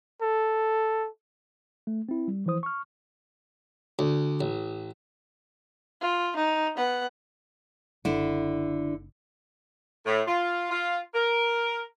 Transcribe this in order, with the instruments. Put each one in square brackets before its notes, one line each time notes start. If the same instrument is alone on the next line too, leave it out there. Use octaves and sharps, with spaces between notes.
[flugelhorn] A4
[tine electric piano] A3
C4 E4
G3
E3 F3 E4 C5 D#6
C#6 F6
[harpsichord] D2
A1
[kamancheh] F4
D#4
B3 F#5
[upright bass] F#1 [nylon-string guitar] D3 E4
[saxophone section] A2
F4
F4
A#4